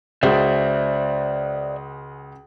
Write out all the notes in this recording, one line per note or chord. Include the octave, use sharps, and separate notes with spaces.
C#2 F#4 G#4 C5 D5 E5